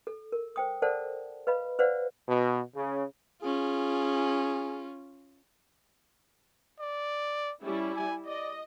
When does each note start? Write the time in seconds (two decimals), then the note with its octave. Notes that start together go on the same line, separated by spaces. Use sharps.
0.07 A4
0.32 A#4
0.56 C5 G5 D#6
0.82 A4 A#4 C5 D5 F#5 A5
1.47 B4 D#5 F5 B5
1.79 B4 C5 D5 F5 F#5
2.27 B2
2.74 C#3
3.42 C#4 F4 G#4
6.80 D5
7.62 G3 C#4 E4
7.96 G#5
8.26 D5 D#5